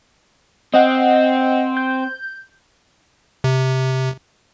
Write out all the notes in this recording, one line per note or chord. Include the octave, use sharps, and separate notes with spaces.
C4 D#5 F#5
G6
C3